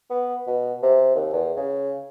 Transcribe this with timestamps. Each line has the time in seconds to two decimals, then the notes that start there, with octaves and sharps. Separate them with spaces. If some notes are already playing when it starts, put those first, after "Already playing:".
0.10 B3
0.47 B2
0.83 C3
1.15 D#2
1.33 E2
1.57 C#3